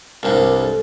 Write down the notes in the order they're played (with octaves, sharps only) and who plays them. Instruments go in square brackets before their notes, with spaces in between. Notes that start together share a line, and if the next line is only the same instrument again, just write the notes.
[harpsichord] C2 G2 [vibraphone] A#4
[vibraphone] A4